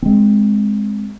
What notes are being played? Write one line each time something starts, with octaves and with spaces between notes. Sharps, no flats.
G#3 C4